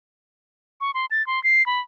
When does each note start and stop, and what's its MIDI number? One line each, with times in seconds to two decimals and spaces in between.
0.81 0.91 85
0.94 1.06 84
1.11 1.25 93
1.27 1.42 84
1.44 1.65 96
1.66 1.80 83